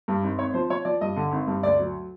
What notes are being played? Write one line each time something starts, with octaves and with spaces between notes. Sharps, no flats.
G2
G#1
G#1 C#5
F3 C5
F3 C#5
F3 D5
G2 D#5
D3
G#1
G2
D2 D5
F#3